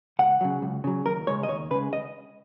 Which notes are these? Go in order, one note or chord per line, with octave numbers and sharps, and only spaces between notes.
C#2 F#5
C#3 F#3
C#2
C#3 F#3
D#2 A#4
C#3 G#3 C#5
D#5
D#2 C#5
C#3 G#3 B4
D#5